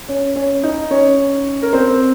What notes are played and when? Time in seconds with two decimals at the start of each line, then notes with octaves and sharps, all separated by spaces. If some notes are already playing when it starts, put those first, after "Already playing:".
0.08 C#4 C#5
0.36 C#4 C#5
0.63 D#4 D#5
0.91 C#4 C#5
1.62 A#4
1.73 C4 C5